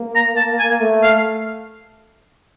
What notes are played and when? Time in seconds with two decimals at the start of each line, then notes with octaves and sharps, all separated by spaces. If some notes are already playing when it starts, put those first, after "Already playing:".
Already playing: A#3
0.15 A#5
0.37 A5
0.59 G#5
0.81 A3
1.03 F5